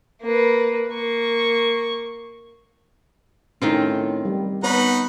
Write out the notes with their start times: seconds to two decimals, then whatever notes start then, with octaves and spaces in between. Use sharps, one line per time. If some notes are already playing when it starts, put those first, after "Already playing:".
0.22 A#3 B4
0.90 A#3 C#6
3.62 A2 D#3 C4 C#4 F4
4.25 G3
4.63 B3 D#4 B4 C#5 F#5 B5